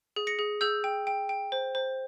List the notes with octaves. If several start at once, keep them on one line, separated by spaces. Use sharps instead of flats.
G#4
A#6 C#7
G#4
G#4 E6 G6
G5
G5
G5
C5
C5